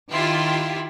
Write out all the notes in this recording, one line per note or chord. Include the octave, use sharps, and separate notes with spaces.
D#3 E4 F4 G4